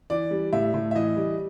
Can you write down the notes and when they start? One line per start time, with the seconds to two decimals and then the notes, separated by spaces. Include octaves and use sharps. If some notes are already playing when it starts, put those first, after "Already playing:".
0.10 E3 D5
0.31 G3
0.53 A2 E5
0.74 A2
0.91 E5
0.95 E3 D#5
1.16 G3